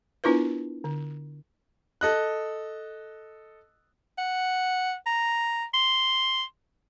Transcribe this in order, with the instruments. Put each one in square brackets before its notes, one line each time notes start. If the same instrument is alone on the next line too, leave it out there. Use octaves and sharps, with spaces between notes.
[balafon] B3 D4 E4 F4 A#4 B4
D3
[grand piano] A4 D#5 F#6
[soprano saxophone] F#5
A#5
C6